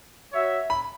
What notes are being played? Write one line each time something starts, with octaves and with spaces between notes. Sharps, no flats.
F#4 C#5 E5
B5